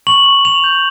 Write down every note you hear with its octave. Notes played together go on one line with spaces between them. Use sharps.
C#6 F#7
C#6
C#6 F7
G6